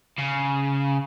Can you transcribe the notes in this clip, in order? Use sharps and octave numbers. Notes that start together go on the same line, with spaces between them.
C#3